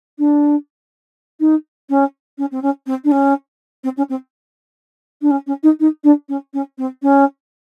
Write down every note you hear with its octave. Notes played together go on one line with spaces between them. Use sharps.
D4
D#4
C#4
C#4
C4
C#4
C4
D4
C#4
C4
C#4
C4
D4
C#4
C#4
D#4
D#4
D4
C#4
C#4
C4
C#4